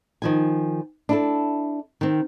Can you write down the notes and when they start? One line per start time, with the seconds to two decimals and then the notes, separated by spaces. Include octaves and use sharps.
0.22 D#3 F3 G#5
1.09 D4 E4 A4
2.01 D#3 C4